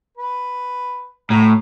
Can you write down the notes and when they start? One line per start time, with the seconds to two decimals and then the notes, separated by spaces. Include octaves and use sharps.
0.17 B4
1.30 A2 F#4 E5 A#5